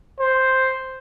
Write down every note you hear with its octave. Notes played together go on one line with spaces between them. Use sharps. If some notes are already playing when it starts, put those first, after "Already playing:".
C5